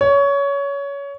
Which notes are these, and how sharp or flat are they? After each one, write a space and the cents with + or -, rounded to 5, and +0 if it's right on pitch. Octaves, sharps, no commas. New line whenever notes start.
C#5 +20